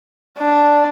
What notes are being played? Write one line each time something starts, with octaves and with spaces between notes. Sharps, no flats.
D4